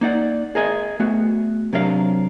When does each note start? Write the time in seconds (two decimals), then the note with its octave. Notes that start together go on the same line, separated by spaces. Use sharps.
0.01 A#3 D#4 D5 F#5
0.55 G#4 A#4 D#5 G#5
1.00 A3 B3 F#4
1.73 C3 F#3 D4 A#4 E5 F5